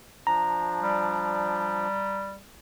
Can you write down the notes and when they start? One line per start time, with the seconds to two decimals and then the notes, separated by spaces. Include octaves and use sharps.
0.27 F3 D4 A#5
0.80 G3